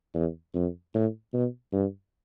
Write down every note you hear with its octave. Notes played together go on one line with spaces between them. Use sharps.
E2
F2
A2
B2
G2